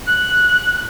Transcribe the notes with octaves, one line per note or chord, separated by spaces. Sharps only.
F#6